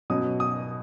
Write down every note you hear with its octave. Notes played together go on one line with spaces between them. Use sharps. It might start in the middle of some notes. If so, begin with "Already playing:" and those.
B2 F#3 C#4 D#6
D#6